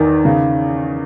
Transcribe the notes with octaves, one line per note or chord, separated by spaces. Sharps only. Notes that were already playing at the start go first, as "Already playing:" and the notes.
Already playing: E2 D#3
C#3